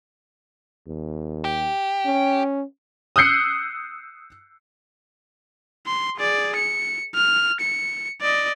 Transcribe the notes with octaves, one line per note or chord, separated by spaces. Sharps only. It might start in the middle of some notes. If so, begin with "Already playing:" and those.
D#2
G4
C#4
D#6 E6 F#6 G6 C7 C#7
C6
G#4 D5
C#7
F6
C#7
D5 D#5